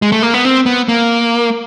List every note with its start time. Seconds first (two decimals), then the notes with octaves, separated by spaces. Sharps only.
0.02 G#3
0.12 A3
0.23 A#3
0.34 B3
0.45 C4
0.66 B3
0.88 A#3